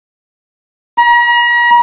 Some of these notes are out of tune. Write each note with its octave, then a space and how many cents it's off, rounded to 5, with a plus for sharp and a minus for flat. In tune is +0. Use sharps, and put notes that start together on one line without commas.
A#5 +40